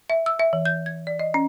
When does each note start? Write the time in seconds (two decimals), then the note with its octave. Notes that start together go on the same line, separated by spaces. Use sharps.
0.10 E5
0.26 E6
0.39 E5
0.53 E3
0.65 G6
0.86 G#6
1.07 D5
1.19 D#5
1.34 C#4